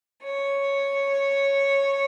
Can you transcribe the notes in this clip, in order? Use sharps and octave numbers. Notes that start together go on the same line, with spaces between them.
C#5